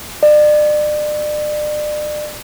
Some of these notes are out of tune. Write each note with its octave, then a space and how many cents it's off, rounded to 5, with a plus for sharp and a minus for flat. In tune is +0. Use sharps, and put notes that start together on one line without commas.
D5 +35